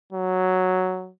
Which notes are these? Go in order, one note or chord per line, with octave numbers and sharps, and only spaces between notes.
F#3